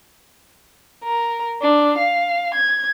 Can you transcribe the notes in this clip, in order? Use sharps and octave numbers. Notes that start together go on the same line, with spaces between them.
A#4
D4
F5
G#6